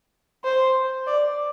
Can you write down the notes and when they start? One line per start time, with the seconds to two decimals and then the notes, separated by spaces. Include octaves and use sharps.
0.44 C5
1.07 D5